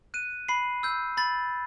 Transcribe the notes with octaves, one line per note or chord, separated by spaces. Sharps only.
F#6 D#7
B5 C7
E6 G6
B5 A6